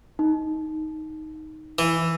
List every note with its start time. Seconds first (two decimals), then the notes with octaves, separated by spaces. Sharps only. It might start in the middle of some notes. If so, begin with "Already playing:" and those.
0.19 D#4
1.79 E3